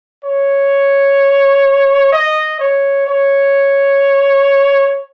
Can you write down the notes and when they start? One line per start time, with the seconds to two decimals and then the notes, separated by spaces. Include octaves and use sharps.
0.24 C#5
2.12 D#5
2.59 C#5
3.07 C#5